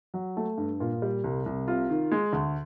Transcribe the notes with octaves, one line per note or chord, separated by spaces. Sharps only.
F#3
A3
G2
A#2 F4
G3
C2
C2
C3 F4
D#3
G#3
D2